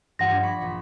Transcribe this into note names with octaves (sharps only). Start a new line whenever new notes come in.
G2 F3 F#5 A#6
D4 D6 G#6
B5 C#6 B6
A#1